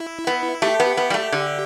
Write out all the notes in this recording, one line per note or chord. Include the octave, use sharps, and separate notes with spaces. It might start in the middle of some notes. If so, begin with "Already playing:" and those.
Already playing: E4
B3
A3 G4
B3
B3
G3
A3
D3